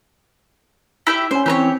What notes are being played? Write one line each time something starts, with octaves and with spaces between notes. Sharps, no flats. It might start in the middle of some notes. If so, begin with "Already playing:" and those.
E4 G4 E5
C#4 C5 G#5
E3 C4 G4 B4 C#5